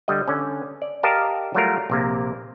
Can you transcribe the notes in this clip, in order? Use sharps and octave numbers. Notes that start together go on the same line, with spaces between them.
D3 G3 D#5
D3 C#4
D5
G4 A#4 D#5 F5 A5
F#3 G3 A3 F4 A#4
A#1 C3 A#3